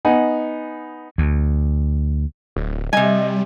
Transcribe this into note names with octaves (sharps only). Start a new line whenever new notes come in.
B3 D#4 F#5 G#5
D2
D1
C3 G3 D#5 G#5